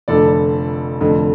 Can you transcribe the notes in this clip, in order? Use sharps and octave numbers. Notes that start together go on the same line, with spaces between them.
F1 F2 D3 A4 D5
F1 F2 D3